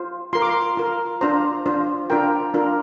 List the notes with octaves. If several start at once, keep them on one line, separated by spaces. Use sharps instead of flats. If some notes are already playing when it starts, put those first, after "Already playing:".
Already playing: F4 C5
F4 A#4 C6
D6
C6
F4 A#4
D4 F4 C5 A#5
D4 F4 C5
D4 F4 A#4 G5
D4 F4 A#4